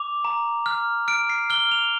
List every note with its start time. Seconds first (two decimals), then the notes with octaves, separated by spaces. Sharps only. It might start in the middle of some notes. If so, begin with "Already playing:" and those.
Already playing: D6 F7
0.25 A#5
0.66 F6
1.08 F6 D7
1.30 C7
1.50 F6 G7
1.71 F7